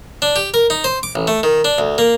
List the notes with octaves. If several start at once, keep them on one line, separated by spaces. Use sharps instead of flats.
D4
G4
A#4
D#4
C5
D6
A1
A3
D#3
D4
D2
A#3